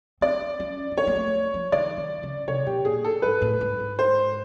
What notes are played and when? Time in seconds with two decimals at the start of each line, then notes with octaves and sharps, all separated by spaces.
0.21 C4 D5
0.60 C#4
0.91 C#4
0.97 C4 C#5
1.07 A#3
1.16 A3
1.54 F3
1.72 D#3 D5
1.97 D#3
2.23 C#3
2.48 C3 C#5
2.66 B2 G4
2.85 A#2 G#4
3.04 A4
3.22 G#2 B4
3.41 A2
3.61 G#2
3.79 G#2
3.99 C5